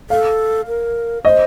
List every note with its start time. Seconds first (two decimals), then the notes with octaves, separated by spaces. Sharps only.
0.10 A4 F5
0.67 A#4
1.25 C5 D#5